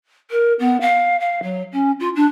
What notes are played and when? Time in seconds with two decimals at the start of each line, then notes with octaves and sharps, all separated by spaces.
0.31 A#4
0.59 B3
0.81 F5
1.20 F5
1.43 F#3
1.72 C#4
2.00 F4
2.15 D4